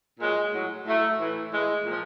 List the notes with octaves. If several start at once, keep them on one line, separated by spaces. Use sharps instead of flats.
A#2 F#3 G#3
A2 F#3
A2 F#3 A3
A2 E3
A2 E3 G#3
A#2 F3